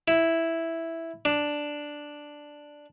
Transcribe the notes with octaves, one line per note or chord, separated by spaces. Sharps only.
E4
D4